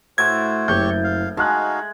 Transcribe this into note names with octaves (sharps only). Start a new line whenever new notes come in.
A2 F#4 C5 G#6
F#1 G4 C#5 C#6 G6
F5
G#3 D#4 F#4 F5 A5 F#6